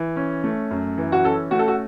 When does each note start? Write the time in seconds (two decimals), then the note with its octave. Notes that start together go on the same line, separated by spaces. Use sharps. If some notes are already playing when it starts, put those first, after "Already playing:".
Already playing: E3
0.16 C#4
0.44 A3
0.71 F#2
0.98 E3
1.12 F#4
1.24 C#4 A4
1.51 A3 F#4
1.59 A4
1.68 F#4